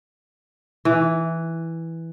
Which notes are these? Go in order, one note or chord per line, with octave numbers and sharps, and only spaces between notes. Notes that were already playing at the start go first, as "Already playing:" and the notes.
E3